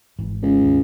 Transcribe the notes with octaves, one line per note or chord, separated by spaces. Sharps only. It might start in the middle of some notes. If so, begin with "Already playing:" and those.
G#1 G#2 E3
C#2
D#2 G#2